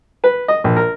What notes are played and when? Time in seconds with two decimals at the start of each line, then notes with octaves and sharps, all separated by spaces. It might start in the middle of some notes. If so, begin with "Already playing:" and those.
0.24 B4
0.48 D#5
0.64 A#1
0.76 A#4